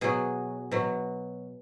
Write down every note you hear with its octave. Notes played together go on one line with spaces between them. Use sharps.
B2 F#3 G#4
B2 F#3